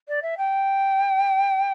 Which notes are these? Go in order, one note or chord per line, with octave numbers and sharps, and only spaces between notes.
D5
E5
G5